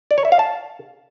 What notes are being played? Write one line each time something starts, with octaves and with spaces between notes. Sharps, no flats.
D5
C#5
E5
F5
A5